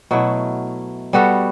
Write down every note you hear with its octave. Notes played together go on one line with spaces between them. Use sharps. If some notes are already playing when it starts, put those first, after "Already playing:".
B2 F#3 A3 E4
G3 B3 F#4 A4